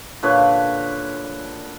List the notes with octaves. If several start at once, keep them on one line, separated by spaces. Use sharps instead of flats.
A#2 D3 B4 C#5